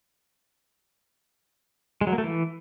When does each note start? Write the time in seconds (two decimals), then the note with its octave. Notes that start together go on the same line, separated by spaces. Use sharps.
2.01 G#3
2.07 F#3
2.13 A#3
2.18 A3
2.24 E3